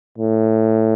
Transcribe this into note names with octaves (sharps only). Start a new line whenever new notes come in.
A2